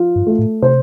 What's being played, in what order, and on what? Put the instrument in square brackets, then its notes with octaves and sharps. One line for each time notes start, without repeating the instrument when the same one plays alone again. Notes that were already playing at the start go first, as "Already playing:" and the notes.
Already playing: [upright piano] F3 F4
[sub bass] G2
[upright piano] A3
[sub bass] A2
[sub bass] C3 [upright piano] C5